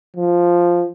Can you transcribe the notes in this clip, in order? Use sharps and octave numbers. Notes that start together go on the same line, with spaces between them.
F3